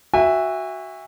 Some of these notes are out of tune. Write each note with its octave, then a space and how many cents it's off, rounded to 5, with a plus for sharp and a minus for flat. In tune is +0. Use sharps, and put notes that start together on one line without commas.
F#4 +0 E5 +0 G#5 -40